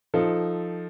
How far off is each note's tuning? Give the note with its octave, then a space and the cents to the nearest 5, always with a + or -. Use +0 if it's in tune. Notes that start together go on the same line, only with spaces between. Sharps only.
F3 +0 D#4 +0 A4 +0